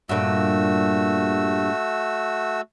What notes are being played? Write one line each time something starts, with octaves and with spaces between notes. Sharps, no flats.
G2 A#2 A3 F#4 E6